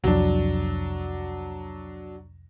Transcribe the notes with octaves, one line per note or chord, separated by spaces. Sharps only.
C2 F2 F#3 D4